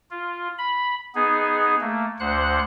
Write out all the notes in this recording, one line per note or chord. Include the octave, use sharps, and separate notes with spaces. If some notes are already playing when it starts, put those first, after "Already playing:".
F4
B5
B3 D#4 G#4
A3 A#3
D2 C5 F#5 F#6